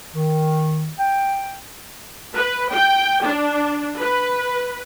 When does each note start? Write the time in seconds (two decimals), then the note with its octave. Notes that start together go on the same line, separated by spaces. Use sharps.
0.15 D#3
0.99 G5
2.35 B4
2.71 G5
3.25 D4
3.99 B4